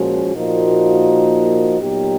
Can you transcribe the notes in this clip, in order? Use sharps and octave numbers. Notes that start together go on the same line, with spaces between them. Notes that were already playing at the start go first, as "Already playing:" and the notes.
Already playing: A#2 F3 G#3 C#4 F#4
A#2 F3 A#3 D#4 F#4
A#2 F#3 B3 D#4 G4